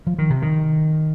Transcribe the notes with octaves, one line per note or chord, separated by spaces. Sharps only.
F3
D#3
C3
D#3